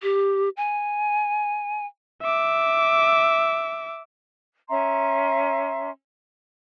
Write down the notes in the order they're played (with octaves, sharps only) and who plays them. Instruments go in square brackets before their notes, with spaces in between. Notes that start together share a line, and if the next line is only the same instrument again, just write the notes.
[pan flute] G4
G#5
[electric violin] E5 D6
[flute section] C#4 E5 A#5 C6